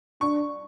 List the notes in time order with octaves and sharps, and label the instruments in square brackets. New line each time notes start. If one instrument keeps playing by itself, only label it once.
[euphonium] D4 [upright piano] C#6